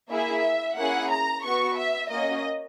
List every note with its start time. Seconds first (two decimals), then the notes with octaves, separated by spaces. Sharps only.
0.11 A#3 E4 G#4 E5
0.77 A#3 C#4 E4 G#4 F#5
1.10 A#5
1.44 B3 F#4 C#6
1.77 E5
2.10 A#3 C#4 F#4 D#5